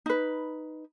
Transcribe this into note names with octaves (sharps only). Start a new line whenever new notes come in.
D#4 B4